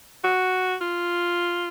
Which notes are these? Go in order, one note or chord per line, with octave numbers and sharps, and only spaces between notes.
F#4
F4